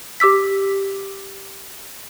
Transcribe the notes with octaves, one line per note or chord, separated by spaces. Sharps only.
G4 D6 E6 B6